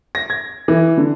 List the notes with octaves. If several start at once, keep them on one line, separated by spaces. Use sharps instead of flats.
A#6
G#6
E3
D3